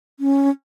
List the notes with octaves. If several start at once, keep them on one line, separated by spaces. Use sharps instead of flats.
C#4